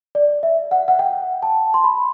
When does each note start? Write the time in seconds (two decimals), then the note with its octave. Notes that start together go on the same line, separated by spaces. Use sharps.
0.15 D5
0.43 E5
0.71 F#5
0.88 F#5
0.99 G5
1.43 A5
1.74 C6
1.84 B5